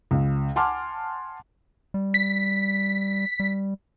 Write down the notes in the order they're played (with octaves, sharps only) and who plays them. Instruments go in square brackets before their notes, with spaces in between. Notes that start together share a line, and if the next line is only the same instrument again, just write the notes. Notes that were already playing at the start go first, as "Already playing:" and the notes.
[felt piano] C#2 C#3
F#5 G#5 A5 C6 D6 F6
[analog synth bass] G3
[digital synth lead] B6
[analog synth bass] G3